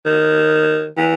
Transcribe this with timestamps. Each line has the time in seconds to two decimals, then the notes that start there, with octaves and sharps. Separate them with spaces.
0.06 D#3
0.98 E3